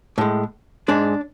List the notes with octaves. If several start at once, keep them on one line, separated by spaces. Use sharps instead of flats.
A2 G#3
G#2 G#3 D4